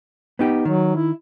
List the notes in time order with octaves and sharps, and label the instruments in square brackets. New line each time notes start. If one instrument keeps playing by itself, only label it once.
[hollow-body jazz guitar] B3 D#4 G4
[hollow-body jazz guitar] D#3 [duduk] F#3
[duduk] E4